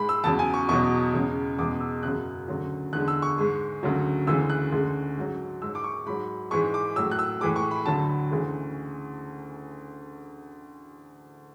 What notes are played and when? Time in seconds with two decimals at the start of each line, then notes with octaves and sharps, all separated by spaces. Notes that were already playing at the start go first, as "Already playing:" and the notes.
Already playing: G#2 G#3 B5
0.09 E6
0.24 E2 C#3 F#3 A5
0.39 G#5
0.54 C#6
0.69 E2 B2 F#3 C#6
1.14 E2 C#3 G#3
1.58 E2 B2 G#3 D6
1.80 E6
2.03 F#2 C#3 F#3 F#6
2.48 D2 C#3 F#3
2.92 E2 D3 G#3 F#6
3.08 E6
3.22 C#6
3.38 G#2 G#3
3.83 D2 C#3 F#3
4.27 D2 C#3 E3 G#3 E6
4.50 F#6
4.72 D2 C#3 G#3
5.17 G#2 F#3
5.62 G#2 G#3 E6
5.75 D6
5.84 C#6
6.06 G#2 F#3 B5
6.51 G#2 E3 G#3 C#6
6.74 D6
6.96 A2 F#3 E6
7.11 F#6
7.19 E6
7.41 A2 E3 G#3 D6
7.56 C#6
7.71 B5
7.86 D2 D3 F#3 A5
8.08 B5
8.31 D2 C#3 E3 G#3